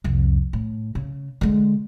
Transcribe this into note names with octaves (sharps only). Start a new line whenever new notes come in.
C2 F2
A2
C#3
D3 G#3